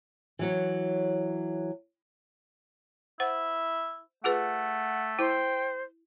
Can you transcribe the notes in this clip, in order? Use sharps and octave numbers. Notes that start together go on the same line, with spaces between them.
E3 F#3 C#5
E4 C5 F#5
A3 F4 G#4 B4 F#5
E4 C5 G5